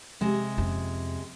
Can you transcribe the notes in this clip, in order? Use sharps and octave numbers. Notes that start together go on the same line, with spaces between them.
C3 G#3
F2 C#4